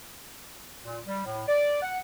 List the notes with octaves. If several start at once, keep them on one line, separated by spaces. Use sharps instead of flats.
A#2
G3
A2
D5
F#5